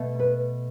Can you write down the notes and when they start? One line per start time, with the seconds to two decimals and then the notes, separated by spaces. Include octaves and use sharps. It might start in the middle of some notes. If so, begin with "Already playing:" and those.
Already playing: B2 A3
0.19 B4